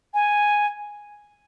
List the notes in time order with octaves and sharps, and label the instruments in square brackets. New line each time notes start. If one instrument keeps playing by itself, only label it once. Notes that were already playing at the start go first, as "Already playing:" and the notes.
[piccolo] G#5